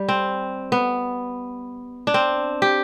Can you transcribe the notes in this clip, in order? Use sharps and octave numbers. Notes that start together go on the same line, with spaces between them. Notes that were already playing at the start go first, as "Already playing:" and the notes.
Already playing: G3
C4
B3
D4
C4
G4